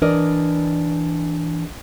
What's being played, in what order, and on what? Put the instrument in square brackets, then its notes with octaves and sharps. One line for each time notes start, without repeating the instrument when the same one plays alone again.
[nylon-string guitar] E3 D4 A#4 D5 D#5